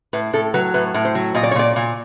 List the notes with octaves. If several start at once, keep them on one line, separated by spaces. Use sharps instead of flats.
A2 B4
A2 A4
F#3 B4
A2 B4
A2
C5
F#3
A#2 D#5
D5
C#5
A#2 D5
A#2